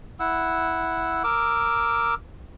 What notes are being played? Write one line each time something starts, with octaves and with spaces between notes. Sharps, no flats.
E4 F#5 E6
A#4 D6 E6